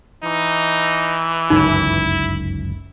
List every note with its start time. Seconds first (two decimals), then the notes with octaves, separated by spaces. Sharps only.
0.24 E3 D#4
1.50 G1 C#2 F#2 D#4 E4